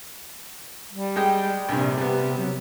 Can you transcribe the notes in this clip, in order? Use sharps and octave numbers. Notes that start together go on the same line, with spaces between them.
G3
G#3 D#5 G5
A#1 G2 C3
G3 B3
F#3